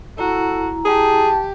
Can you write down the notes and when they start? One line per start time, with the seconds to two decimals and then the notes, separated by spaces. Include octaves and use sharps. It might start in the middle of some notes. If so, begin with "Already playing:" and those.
0.18 E4 F#4 A4 A#5
0.85 G4 G#4 A5